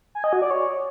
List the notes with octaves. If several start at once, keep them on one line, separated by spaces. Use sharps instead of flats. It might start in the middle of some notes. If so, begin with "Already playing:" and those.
G#5
D#5
F#4
D5
C#5